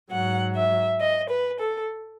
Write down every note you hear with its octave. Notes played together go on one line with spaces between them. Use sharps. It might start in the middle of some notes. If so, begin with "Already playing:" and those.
G#2 F#3 F#5
E5
D#5
B4
A4